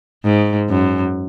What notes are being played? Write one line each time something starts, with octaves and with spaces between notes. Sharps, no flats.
G#2
F#2